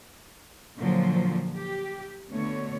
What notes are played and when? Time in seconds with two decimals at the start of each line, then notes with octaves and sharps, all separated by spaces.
0.78 A#2 D3 F3 F#3
1.56 G4
2.30 B2 D3 A3 C#5